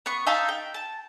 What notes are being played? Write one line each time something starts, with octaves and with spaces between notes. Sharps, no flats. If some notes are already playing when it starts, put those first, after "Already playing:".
B3 C#6
D#4 E5 F5 A5
G5
A5